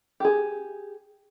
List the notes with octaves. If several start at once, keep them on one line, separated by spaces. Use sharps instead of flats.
G4 G#4